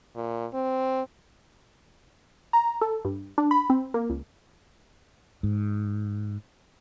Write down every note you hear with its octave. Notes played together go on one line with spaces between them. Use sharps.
A#2
C4
A#5
A4
G2
D4
B5
C4
A#3
C#2
G#2